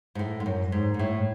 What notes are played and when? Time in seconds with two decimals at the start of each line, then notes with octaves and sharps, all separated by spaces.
0.15 G#2
0.19 A2
0.40 G#2
0.46 F#2
0.72 G#2
0.94 G#2
0.99 A2